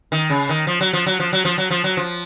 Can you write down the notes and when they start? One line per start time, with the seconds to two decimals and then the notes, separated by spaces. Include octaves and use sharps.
0.12 D#3
0.30 C#3
0.49 D#3
0.67 F3
0.81 F#3
0.93 F3
1.06 F#3
1.20 F3
1.33 F#3
1.45 F3
1.58 F#3
1.70 F3
1.84 F#3
1.97 F3